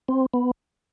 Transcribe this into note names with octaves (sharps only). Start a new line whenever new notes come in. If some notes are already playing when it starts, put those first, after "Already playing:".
C4
B3